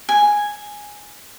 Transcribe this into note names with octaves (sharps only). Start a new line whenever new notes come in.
G#5